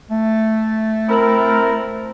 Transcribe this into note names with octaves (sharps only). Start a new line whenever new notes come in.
A3
C4 E4 A#4